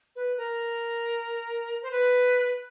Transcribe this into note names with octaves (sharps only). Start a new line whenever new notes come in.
B4
A#4
C5
B4